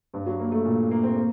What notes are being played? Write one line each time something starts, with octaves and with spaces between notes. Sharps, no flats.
G2
F#3
A#3
A3
A#2
A#3
C4
A#3